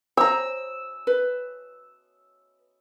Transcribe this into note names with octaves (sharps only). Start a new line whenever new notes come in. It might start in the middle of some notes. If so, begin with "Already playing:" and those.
C5 A#5 E6
B4